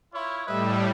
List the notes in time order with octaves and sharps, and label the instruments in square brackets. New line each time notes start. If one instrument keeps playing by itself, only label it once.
[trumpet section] E4 F4 C#5
[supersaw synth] A2 G3 [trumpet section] B4 D#5 E5